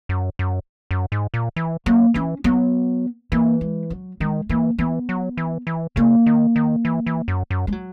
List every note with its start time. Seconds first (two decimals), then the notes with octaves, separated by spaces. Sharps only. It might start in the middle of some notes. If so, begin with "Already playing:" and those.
0.09 F#2
0.39 F#2
0.91 F#2
1.12 G#2
1.34 A#2
1.56 E3
1.86 F#3 A#3
2.14 E3 C#4
2.44 F#3 B3
3.32 E3 A#3
3.61 G#3
3.90 F#3
4.20 D#3 G#3
4.49 E3 A#3
4.78 E3 B3
5.09 F#3
5.37 E3
5.67 E3
5.96 C#3 A#3
6.26 D#3
6.56 D#3
6.85 E3
7.06 E3
7.28 F#2
7.51 F#2
7.67 G#3
7.72 F#3